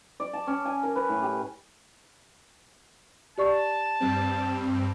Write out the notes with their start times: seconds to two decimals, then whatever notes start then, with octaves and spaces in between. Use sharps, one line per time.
0.20 D5
0.33 A5
0.47 C#4
0.65 G#5
0.83 A#4
0.96 B4
1.09 A2
1.22 G4
3.38 G4 D5 A5 C#6
4.00 G2 G3 C4